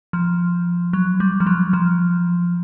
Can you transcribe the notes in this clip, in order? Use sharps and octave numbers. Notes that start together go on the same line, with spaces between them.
F3
F#3
G3
F3
F#3
F3